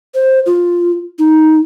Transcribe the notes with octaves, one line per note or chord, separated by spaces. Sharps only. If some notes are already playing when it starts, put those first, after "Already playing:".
C5
F4
D#4